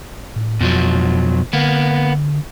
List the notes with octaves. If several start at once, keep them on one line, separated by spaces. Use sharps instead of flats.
A2
F2 B2 F3 F#3
D3 A#3 B3